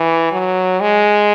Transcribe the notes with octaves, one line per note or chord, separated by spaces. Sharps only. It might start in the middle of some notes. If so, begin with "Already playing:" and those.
Already playing: E3
F#3
G#3